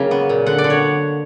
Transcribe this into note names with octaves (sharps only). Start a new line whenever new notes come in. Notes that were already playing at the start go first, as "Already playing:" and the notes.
Already playing: C#3 F#3 A#3 G5
B3
A#2
D3 F#5
D5
D3
C#5